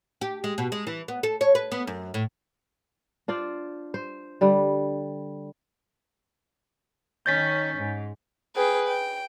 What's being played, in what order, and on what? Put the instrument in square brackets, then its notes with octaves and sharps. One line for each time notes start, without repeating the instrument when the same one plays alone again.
[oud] G4
G#3
B2
G#3
E3
B3
A4
C#5
B4
B3
F#2
A2
[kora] D4 F4 C5 D5
C5
D3 G3 B4
[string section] D#3 C#4 [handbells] G6 A6 B6
[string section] G#2
[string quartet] G#4 B4 G5
G5